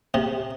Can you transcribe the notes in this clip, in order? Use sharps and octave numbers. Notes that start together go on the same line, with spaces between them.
C3